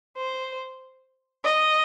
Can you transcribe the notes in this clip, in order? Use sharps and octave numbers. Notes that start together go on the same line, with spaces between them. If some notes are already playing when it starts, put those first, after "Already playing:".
C5
D#5